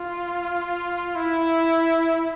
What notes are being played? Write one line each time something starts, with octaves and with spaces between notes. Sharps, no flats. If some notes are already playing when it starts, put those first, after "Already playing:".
Already playing: F4
E4